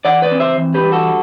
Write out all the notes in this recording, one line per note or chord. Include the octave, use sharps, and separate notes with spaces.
E3 D5 F#5
B4 D5
C4
C5 E5
E3
G4 B4
G3
F#4 A4